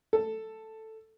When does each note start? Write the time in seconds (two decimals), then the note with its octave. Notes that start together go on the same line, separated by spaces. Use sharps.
0.13 A4